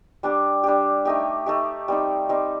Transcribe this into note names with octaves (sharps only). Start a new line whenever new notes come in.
G3 D4 G4
G3 D4 G4
A3 D#4 G4
A3 D#4 G4
G3 C4 D#4
G3 C4 D#4